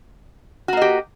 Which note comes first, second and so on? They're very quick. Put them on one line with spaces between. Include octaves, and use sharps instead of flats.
F#4 A#3 D#5 G4